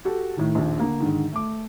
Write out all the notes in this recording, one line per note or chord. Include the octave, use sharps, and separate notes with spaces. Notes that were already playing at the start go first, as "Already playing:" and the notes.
F#4 G4 A4
A2 D#3
A#1 D#2
D3 A#3
G#2 D3 D#3
A3 D6